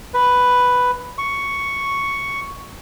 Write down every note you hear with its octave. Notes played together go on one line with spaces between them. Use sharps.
B4
C#6